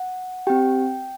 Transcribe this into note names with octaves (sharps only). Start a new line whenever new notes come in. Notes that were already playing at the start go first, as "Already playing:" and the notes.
Already playing: F#5
C4 G4 G5